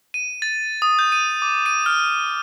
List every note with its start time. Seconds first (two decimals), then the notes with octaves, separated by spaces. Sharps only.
0.14 D#7
0.42 A6
0.82 D#6
0.99 G6
1.12 D#7
1.42 D6
1.66 D#7
1.86 F6